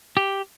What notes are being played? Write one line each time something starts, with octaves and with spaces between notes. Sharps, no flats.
G4